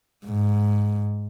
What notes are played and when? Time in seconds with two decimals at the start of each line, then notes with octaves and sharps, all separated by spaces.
0.26 G#2